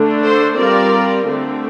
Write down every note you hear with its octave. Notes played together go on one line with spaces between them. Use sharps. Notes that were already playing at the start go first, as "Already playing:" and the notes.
Already playing: D3 A3 D4
A4 C5
G3 C4 F4 A#4 D5
D3 A3 C4